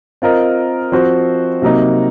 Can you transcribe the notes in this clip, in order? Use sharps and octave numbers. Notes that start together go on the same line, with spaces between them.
C4 F4 A#4 D#5
F3 C4 F#4 C5
C3 F#3 A#3 D#4